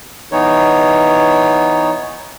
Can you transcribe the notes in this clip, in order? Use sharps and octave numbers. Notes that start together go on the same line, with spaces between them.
E3 B3 D#4 C#5